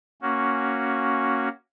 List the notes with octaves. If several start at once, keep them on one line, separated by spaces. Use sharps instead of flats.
A#3 C#4 F#4